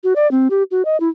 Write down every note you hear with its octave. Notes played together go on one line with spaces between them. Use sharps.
F#4
D5
C4
G4
F#4
D#5
E4